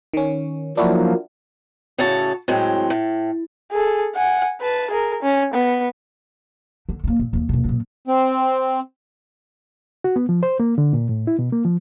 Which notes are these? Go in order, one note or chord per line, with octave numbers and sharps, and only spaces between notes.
D#3 C#4
F3 F#3 A#3 D4 E4 F#4
A2 C#3 F#4 A4 C#5 A5
A2 F#3 G#3 C4
A2
G#4 A4
F#5 G#5
B4 A5
G#4 A#4
C#4
B3
D3
A3 A#3
A#2
D#2 E3
D#2 B2
F#2 A#2
C4
F#4
B3
F3
C5
A#3
D3
A#2
A2
E4
B2
A#3
F3